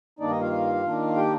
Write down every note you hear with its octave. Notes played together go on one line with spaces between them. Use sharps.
G2 D#3 A#3 D4 D#4 D5
D#4 D#5
F4 F5
D#3 A#3 D4
G4 G5